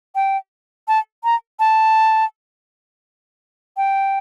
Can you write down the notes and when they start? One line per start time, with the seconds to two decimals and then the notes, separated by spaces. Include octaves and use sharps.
0.15 G5
0.88 A5
1.24 A#5
1.60 A5
3.77 G5